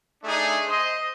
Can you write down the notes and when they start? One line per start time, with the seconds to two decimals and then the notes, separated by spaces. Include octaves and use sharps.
0.24 A3 D4 D#4 G#4
0.67 C5 D#5